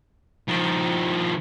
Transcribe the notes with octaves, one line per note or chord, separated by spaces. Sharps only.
D#3 F3